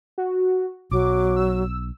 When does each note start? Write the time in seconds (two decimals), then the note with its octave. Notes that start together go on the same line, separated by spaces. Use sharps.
0.18 F#4
0.91 B1 F#3 D6
1.36 E6